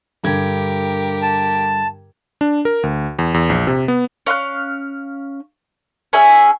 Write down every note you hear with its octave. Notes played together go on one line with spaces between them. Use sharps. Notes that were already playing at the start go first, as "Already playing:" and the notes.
G2 D3 G4 A#4 G#6
A5
D4
A#4
D2
E2
E2
A#1
C3
B3
C#4 F5 C6 F#6
C#4 G#4 E5